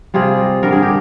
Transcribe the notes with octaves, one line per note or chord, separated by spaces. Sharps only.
C3 G3 F4 G#4
G2 D3 G3 A#4
G#4
G4